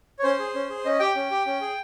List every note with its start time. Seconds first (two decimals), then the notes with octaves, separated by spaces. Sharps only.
0.19 C#5
0.23 C#4 C5
0.40 G#4
0.55 C#4
0.70 G#4
0.85 C#4 D#5
1.00 G4 G5
1.16 C#4
1.31 G4
1.46 C#4
1.61 G#4